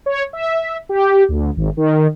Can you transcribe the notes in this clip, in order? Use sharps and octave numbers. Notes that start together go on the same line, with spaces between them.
C#5
E5
G4
D2
G#1
D#3